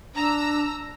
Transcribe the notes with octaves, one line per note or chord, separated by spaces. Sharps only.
D4 A#5 E6